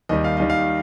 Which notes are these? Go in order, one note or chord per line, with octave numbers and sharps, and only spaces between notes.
D#2 D#3 G3 D#5
F5
D#2 D#3 G3 D#5
F5